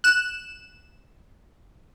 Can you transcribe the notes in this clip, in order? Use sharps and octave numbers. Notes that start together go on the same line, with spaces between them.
F#6 E7